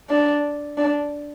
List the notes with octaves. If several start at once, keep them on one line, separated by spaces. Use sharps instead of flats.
D4
D4